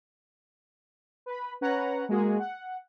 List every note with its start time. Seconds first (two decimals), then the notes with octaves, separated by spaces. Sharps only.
1.26 B4 B5
1.61 C#4 B4 C#5 F#5 A#5
2.09 G#3 A#3 F#4 G#4
2.40 F#5